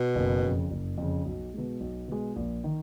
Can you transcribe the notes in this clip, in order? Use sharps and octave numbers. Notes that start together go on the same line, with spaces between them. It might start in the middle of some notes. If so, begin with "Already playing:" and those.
Already playing: B2
F#1
F2 C#3
F#1
F2 C#3
B1
B2 G#3
B1
B2 G#3
A#1
D#3